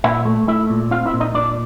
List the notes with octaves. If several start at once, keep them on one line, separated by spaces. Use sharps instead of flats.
A#2 E4 E5
A3
A3 E4 E5
A#2
C4 F4 F5
E4 E5
A#2
D#4 D#5
A#2 D4 D5